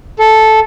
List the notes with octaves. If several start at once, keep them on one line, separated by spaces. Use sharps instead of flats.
A4